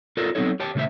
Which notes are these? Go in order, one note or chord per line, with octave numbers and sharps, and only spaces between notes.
F4 A4 A#4 C5 D5
F#3 B3 C4 D#4 A4 C#5
G4 C#5 G5 A5
A#2 C#3 A3 C#4 C5 E5